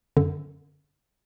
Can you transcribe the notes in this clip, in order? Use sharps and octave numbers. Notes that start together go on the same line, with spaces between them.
F#2 D3